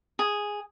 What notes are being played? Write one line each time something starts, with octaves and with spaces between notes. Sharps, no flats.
G#4